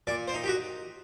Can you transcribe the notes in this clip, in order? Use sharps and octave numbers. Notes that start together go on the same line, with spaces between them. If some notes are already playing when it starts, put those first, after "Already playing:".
A#2 D5
C5
D#4
G4
F#4